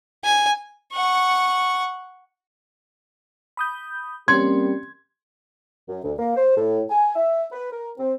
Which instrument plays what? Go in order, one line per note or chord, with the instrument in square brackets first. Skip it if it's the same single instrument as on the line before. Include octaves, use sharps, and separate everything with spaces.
[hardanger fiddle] G#5
[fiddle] F#5 C#6
[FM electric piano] B5 D#6 G6
[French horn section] G3 A#3 G4 [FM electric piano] C4 C#4 [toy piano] C6 [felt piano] G#6
[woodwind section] F#2
D2
A#3
C5
A2
G#5
E5
B4
A#4
C4